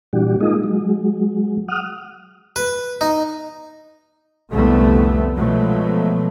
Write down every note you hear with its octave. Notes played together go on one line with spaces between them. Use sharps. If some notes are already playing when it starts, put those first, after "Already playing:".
A#2 E3 G3 D4 F#4 G4
G#3 A#3 D#4 F4 G#4 D#5
F#3 G#3
F#5 D#6 F6
B4
D#4
C2 F2 D3 G3 A3 B3
B2 F3 F#3 G#3 A3